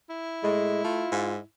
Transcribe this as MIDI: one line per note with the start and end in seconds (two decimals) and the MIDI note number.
0.10 1.44 64
0.43 0.83 45
0.43 0.80 56
0.84 1.05 57
0.84 1.32 65
1.12 1.38 44